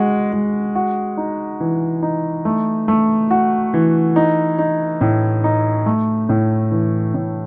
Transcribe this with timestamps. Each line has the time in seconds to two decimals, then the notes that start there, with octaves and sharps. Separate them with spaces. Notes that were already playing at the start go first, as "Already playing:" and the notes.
Already playing: G#3 F#4
0.33 G#3
0.75 F#4
1.17 D#4
1.60 E3
2.03 D#4
2.45 A3
2.88 A3
3.31 F#4
3.74 E3
4.16 D#4
4.59 D#4
5.01 A2
5.44 D#4
5.86 A3
6.29 A2
6.71 E3
7.14 A2